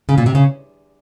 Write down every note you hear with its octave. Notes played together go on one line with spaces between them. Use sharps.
C#3
A#2
C3
C#3